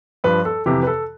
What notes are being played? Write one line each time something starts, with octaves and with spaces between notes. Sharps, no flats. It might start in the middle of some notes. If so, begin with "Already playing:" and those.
G2 F3 B4
A4
F2 C3 E3 G4
B4
A4